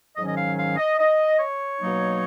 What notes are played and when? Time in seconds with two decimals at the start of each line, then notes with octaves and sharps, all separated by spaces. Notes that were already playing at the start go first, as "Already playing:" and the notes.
0.16 G#2 D#3 F#3 C#4 D#5
0.28 D#5
0.36 F5
0.57 F5
0.77 D#5
0.98 D#5
1.39 C#5
1.80 B2 F#3 A#3 D#4